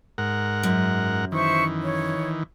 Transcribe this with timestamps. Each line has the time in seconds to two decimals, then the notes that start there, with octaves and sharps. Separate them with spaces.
0.18 G#2 A#4 F#5
0.63 F#2
1.32 D#3 E3 C5 E5 C#6
1.82 C#5